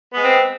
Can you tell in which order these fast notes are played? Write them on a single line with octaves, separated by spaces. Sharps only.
B3 G#3 C4